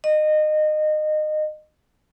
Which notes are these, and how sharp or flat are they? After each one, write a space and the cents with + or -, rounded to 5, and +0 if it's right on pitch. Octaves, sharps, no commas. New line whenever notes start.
D#5 -25